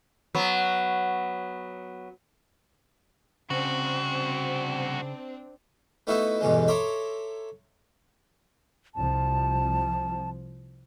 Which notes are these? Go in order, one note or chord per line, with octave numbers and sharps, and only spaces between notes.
F#3 B3
C2 C#3 C4 D4 F#4
A3 B3 D#4 E4 F#4 E5
E2 G2 B2 D3 G#3
A4 C#5 E5 A#5 C6 D6
C2 F3 A5